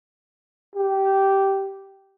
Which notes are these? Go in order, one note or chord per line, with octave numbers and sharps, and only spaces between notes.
G4